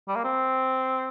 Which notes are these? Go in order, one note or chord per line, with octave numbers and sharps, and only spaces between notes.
G3
A#3
C4